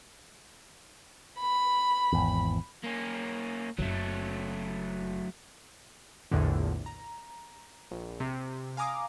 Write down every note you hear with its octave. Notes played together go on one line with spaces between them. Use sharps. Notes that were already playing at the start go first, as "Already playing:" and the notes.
B5
G#1 E2
A#3 C#4
F#1 C#3 F#3 A3
A#1 E2 A2 D3
A#5
A#1
C3
F5 G#5 A#5 D6 D#6